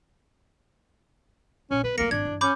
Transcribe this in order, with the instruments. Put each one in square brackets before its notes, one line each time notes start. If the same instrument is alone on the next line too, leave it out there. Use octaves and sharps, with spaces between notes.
[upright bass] A#1 [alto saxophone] C#4
[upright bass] B3 [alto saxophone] B4
[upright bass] D#2 A3 [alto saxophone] A#3 [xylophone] A#6 C#7
[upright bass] G#1 D#3 [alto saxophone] D4 [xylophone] G#6
[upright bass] G2 E3
[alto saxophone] C#4 [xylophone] B5 D6 G6